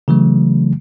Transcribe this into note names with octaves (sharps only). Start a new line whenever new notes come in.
C#3 E3 F#3 A3